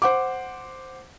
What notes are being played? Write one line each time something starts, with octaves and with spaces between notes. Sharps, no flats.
C5 F#5 D6